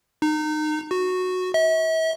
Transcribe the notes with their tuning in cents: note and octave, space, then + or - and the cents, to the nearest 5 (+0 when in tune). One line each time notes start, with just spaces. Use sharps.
D#4 -25
F#4 -10
E5 -40